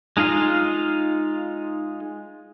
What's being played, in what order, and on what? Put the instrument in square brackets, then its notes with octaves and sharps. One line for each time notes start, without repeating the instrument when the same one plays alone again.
[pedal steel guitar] G#3 D#4 F4 F5